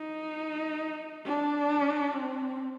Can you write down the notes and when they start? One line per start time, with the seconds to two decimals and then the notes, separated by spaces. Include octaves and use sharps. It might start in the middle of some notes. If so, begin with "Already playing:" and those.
Already playing: D#4
1.26 D4
2.13 C4